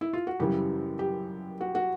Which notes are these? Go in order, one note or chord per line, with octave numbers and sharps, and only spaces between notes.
E4
F4
F#4
F#2 C#3 E3 G3 G4
G4
F#4
F#4